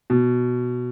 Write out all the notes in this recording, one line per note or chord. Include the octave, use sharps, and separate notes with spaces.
B2